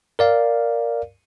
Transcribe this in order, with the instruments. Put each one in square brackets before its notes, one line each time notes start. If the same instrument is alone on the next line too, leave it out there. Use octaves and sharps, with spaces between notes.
[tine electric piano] A#4 D5 F5